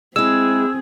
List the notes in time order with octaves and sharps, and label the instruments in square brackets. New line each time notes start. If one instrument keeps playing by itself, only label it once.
[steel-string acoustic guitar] G#3 E4 [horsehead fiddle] C4 G#4 [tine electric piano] E6